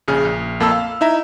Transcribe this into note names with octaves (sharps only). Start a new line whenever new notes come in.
A#1 C#3 G#4 F6
A#1
F2 A#3 A4 A5 B5 E6
F5
D#4 E4 E5 A#5